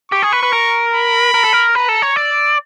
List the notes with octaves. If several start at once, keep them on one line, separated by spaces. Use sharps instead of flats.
G4 C#6
G#4
B4
B4
A#4
B5
A#4
A4
A#4
B4 A#5
A4
C#5
D5 E6